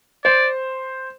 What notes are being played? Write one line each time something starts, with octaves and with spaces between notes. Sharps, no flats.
C5 D5